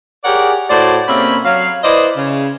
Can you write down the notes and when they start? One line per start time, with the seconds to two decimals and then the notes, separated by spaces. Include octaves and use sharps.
0.24 G4 G#4 A#4 C#5 D5 F#5
0.70 A2 F#4 C5 D5
1.08 C3 A#3 C4 C#4 E5 B5
1.45 F#3 F5
1.83 E4 B4 C5 D5 D#5
2.16 C#3